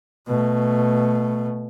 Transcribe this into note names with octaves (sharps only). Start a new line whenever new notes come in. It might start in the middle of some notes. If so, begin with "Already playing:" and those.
B2 A3